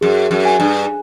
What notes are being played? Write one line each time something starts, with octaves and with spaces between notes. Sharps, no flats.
F#2 G#4
F#2
G#5
G2